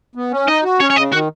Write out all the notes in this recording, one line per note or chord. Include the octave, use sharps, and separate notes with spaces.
B3
C#4
D#4 D#5
F#4
C#4 C#5
C#5
C#3 D#5
D#3 F#4